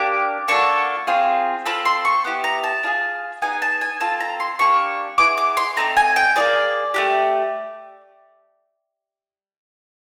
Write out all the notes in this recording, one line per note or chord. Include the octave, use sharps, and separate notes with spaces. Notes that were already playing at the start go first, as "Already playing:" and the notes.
Already playing: A#3 D4 G4 D6
A#3 D4 F#4 A4 C#6
C4 F4 G#4
C4 F4 A4 B5
C6
C#6
B3 E4 G4
A#5
A5
D4 F4 G#4
B3 D#4 G#4 G#5
A5
G#5
C4 F4 A4 A5
A#5
C6
A#3 D4 G4 C#6
B3 E4 G#4 D6
D6
C6
A3 C4 D#4 A#5
G#5
G5
A#3 D#4 G#4 D5
A3 D4 G4